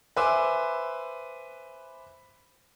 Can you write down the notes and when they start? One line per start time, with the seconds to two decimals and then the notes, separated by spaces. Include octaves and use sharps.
0.17 B4 C5 E5 G#5 D6 E6